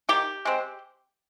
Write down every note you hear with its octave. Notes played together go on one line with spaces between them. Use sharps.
D#3 G4
G#3 C4